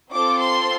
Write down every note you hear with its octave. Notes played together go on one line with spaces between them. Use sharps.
C4 F4 A4 D6
C6